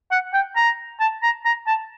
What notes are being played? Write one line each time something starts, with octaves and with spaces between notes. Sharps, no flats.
F#5
G5
A#5
A5
A#5
A#5
A5